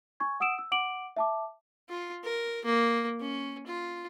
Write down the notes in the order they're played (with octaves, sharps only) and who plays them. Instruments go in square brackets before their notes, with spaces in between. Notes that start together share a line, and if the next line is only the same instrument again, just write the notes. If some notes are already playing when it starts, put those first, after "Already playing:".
[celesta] G#5 C#6 G#6
F#5 D#6 E6 D7 E7
E6
F#5 D6 D7 F#7
E5 A5 D6
[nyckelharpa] F4
A#4
A#3
C#4
F4